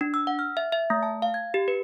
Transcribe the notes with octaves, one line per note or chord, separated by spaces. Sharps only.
D4
E6
F#5
F6
E5
E5
A3
A5
F5
G#6
G4
B4